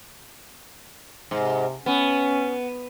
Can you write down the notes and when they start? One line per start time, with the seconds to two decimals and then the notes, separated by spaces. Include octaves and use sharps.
1.31 G#2 C3
1.86 B3 C#4